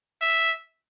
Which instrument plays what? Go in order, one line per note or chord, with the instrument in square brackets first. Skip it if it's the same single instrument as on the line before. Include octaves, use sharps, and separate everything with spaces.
[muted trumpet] E5